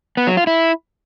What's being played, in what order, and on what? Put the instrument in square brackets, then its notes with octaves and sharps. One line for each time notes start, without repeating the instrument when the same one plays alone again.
[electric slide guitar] B3
F#3
F4
E4